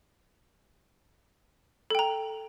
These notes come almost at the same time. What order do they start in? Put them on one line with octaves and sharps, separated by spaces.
A4 G5 A#5